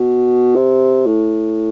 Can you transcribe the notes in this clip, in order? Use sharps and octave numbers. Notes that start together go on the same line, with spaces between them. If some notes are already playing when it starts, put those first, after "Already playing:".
Already playing: B2
C3
A2